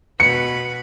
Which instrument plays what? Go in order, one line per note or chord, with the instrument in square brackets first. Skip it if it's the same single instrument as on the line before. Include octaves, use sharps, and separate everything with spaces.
[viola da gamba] B2 B4 [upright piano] C#7